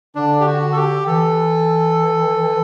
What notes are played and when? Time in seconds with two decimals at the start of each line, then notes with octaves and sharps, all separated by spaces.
0.15 D3 D4
0.40 G4
0.46 F#4
0.72 A4
0.76 G4
1.06 E3 A4